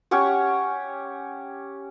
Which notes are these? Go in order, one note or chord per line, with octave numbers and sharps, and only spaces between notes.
C#4 G4 F#5 C#6